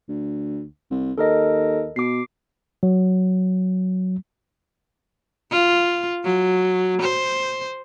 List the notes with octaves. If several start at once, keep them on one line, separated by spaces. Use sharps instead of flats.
D2
C2
D#2 A4 A#4 D#5
B2 D6 C7
F#3
F4
F#3
C5